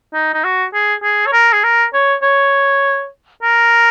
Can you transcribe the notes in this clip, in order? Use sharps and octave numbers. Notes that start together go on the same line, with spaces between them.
D#4
D#4
F#4
G#4
G#4
C#5
A#4
G#4
A#4
C#5
C#5
A#4